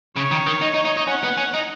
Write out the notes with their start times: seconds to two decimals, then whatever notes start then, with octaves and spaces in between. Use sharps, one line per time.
0.16 C#3 C#5
0.32 D#3
0.47 D#3
0.62 D#4
0.74 D#4
0.85 D#4
0.97 D#4
1.07 C#4 F#5
1.24 B3
1.38 C#4
1.54 D#4